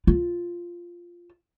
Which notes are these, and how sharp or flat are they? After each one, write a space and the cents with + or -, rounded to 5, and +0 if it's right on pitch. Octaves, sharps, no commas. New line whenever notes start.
F4 -5